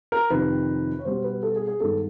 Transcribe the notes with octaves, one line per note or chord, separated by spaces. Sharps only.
A#4
F2 C3 D#3 B4
C#5
B2 G3 B3 C5
B4
A4
G#4
G#4
G2 D#3 G#3 B3 A4